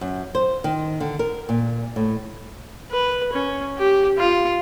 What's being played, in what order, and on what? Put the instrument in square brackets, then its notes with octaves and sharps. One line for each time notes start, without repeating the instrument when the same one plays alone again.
[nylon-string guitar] F#2
C5
D#3
D3
A#4
A#2
A2
[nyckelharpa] B4
C#4
G4
F4